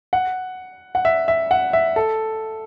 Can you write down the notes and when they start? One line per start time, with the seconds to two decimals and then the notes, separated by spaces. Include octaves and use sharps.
0.13 F#5
0.95 F#5
1.05 E5
1.28 E5
1.51 F#5
1.73 E5
1.96 A4